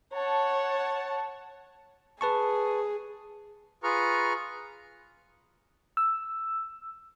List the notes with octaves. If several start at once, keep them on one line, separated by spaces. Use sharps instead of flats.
C#5 F#5 A5
G#4 B4 A5 C#6
F4 G#4 B4 A#5 C#6 F6
E6